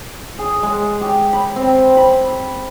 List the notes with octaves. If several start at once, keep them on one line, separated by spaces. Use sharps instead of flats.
G#4
G#3
G4
B5
C4
B5